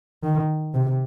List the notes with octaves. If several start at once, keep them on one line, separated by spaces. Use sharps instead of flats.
D#3
C3